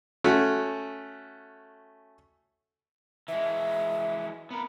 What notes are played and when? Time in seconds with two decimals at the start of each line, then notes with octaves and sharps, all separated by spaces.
0.24 A3 C#4 F#4
3.28 E3 G#3 E5
4.51 B3 A#4